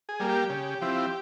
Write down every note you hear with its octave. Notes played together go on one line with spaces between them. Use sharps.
G#4
G3 A#3
G4
C#3
F3 C4 E4